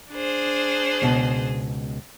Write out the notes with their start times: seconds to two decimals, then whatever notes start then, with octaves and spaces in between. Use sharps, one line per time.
0.12 D4 G#4 C5
1.02 C#2 B2